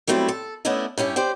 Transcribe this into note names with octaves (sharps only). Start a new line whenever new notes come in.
F#3 G3 A3 C4 E4
A4
A3 B3 C#4 D4 E4 D#5
G2 C#4 E4 G4
G4 C5 D5 G5